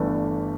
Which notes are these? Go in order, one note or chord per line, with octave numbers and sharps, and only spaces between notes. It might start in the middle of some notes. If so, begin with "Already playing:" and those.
Already playing: G1 G2 E3 A3 D4